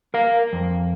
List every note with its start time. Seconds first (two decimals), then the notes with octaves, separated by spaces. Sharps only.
0.14 A#4 F5
0.53 F2